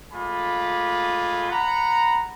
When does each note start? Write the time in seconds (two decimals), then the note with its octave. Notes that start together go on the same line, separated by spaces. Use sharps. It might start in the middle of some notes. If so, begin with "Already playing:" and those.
0.11 G#3 A3 F4 G#5 B5 D6
1.50 F#5 A#5 B5